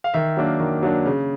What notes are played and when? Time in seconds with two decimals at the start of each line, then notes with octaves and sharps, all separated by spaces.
0.04 F5
0.14 D#3 E5
0.37 F#3 A#3 D4
0.60 D#3
0.83 F#3 A#3 D4
1.06 C#3